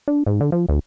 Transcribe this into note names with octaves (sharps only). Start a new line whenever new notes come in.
D4
G#2
D3
F3
D2